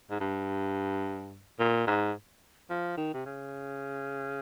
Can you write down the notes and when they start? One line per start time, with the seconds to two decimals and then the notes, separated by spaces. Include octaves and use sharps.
0.11 G#2
0.20 G2
1.59 A#2
1.87 G#2
2.70 F3
2.97 D#3
3.14 C3
3.26 C#3